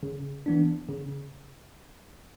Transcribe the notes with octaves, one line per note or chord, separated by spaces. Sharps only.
C#3
E3 B3 D4
C#3